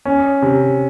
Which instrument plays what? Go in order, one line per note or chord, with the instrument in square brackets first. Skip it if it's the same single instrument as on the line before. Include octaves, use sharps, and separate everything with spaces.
[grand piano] C#4
C3